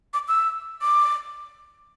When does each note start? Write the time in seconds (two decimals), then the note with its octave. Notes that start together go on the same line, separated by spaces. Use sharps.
0.14 D6
0.28 E6
0.82 D6